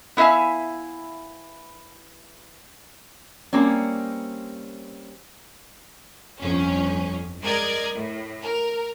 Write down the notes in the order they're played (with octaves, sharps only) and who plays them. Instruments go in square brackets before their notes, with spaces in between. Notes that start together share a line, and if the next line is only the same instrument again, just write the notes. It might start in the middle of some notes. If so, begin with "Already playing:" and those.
[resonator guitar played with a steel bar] B3 E4 E5 F5 G#5
G3 A#3 C4 C#4
[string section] G1 F2 C#4
G#3 A#4 D5 D#5 D#6 G#6
A2
A#4